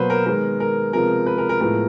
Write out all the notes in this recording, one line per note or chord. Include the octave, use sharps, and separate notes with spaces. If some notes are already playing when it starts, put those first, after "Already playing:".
Already playing: B2 F#3 A#3 B4 C5
A#4
D#3 G#3 B3 A#4
A#4
C3 F3 G#3 B3 A#4
B4
A#4
A#4
A2 F3 G#3 B3 A#4